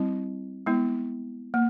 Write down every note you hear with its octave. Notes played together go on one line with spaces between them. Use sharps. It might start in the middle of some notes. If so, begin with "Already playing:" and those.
Already playing: G3 C4 E4
G#3 B3 E4
A#3